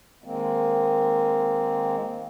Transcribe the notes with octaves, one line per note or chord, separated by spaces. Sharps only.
D#3 G#3 A#3 C4